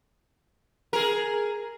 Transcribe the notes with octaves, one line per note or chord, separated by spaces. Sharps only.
G#4 A#4